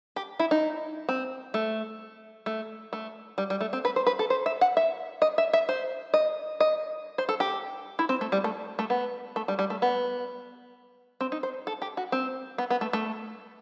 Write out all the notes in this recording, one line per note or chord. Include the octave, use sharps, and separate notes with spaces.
G4
E4
D#4
C4
A3
A3
A3
G3
G3
A3
C4
B4
C5
B4
A4
C5
E5
F#5
E5
D#5
E5
E5
C5
D#5
D#5
C5
A4
G4
E4
C4
A3
G3
A3
A3
B3
A3
G3
G3
A3
B3
C4
D#4
C5
A4
G4
F#4
C4
B3
B3
A3
A3